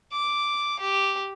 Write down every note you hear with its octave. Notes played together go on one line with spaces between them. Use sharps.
D6
G4